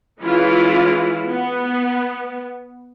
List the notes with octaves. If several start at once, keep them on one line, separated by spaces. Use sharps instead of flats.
E3 G#3 C#4 E4 F4
B3